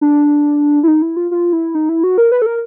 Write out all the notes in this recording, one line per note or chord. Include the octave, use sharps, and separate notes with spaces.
D4
E4
D#4
E4
F4
F4
E4
D#4
E4
F#4
A#4
B4
A4
A#4